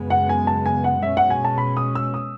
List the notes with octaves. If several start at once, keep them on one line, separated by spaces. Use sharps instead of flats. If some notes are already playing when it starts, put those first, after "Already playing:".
Already playing: F#2 C#3 G#3 B3
F#5
G#5
A5
G#5
F#5
B2 G#3 C#4 E5
F#5
G#5
A5
B5
D#6
E6
D#6